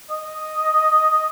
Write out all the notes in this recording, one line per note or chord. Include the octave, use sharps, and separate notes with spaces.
D#5